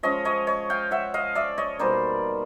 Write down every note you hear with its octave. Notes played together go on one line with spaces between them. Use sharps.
F3 G#3 C#4 C#5 D#5
C#5 D#5
C#5 D#5
F5 G5
E5 F#5
D#5 F5
D5 E5
C#5 D#5
B2 G3 A#3 D#4 C5 D5